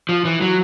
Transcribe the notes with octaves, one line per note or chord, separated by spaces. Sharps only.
F3
E3
F#3